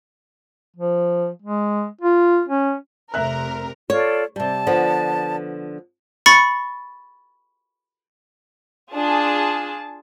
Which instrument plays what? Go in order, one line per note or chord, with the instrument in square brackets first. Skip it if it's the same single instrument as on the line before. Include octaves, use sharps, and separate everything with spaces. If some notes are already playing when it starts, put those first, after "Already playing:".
[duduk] F3
G#3
F4
C#4
[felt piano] F1 E5 F#6 [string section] C3 A#4
[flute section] F4 A4 D5 [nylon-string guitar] C#5
[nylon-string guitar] C3 G3 [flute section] D5 A5
[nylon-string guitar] D3 F3 B3
[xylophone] B5 C#6 A6 C#7
[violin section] D4 F4 G#4 A5